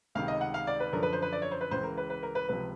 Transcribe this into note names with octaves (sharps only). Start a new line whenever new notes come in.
C#2 C3 D#3 F5
D#5
F#5
F5
D5
B4
F#2 D3 F3 A#4
B4
C5
B4
D5
C#5
C5
B4
C#2 C#3 E3 C5
A#4
B4
B4
A#4
B4
C#2 C3 F3 B4